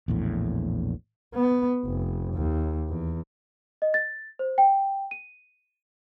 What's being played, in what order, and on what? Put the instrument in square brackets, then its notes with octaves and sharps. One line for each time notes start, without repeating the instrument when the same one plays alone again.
[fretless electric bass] A#1 E2 A2
[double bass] B3
F1
D#2
E2
[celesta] D#5
A6
C5
G5
D#7